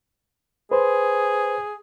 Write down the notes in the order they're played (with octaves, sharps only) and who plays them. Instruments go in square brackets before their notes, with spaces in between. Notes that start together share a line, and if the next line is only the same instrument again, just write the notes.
[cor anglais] G#4 [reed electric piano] B4 C5